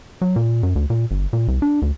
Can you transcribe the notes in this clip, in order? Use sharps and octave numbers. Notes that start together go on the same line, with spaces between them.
F#3
A#2
F#2
D2
A#2
G1
A#2
C2
D4
D2